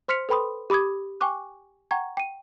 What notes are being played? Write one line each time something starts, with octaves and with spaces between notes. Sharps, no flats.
C5 C6 F6 B6 C#7 F7
A4 B4 G5 B5 C6 D#6
G4 B5 D6 D#6 G#6
G5 G#5 C#6 D6 F#6
F#5 G5 A#5 C#6 G#6
G5 D#7